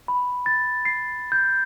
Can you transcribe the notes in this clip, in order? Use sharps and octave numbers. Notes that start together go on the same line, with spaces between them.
B5
A6
C7
G6